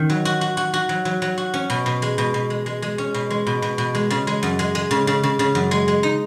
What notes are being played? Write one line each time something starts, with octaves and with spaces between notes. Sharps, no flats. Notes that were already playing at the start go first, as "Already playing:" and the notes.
Already playing: D#3 C#4
F#3
F#4
F#4
F#4
F#4
F#3
F#3
F#3
F#4
C#4
B2
B2
G#3
B2
B2
G#3
G#3
G#3
C#4
B2
G#3
B2
B2
B2
G#3
C#3
G#3
F#2
G#3
G#3
C#3
C#3
C#3
C#3
F#2
G#3
G#3
D#4